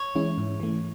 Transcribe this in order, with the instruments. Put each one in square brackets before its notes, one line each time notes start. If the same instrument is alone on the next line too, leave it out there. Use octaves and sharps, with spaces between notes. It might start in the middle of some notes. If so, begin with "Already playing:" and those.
Already playing: [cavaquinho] C#5
[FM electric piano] E3 G#3 C#4 E4
G#2
E3 A3